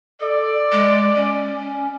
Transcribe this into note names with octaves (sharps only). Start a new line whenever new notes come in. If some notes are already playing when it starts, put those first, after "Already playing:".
A4 D5
G#3
C#4